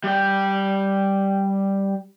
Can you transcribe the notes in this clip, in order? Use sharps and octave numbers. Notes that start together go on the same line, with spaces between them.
G3 G5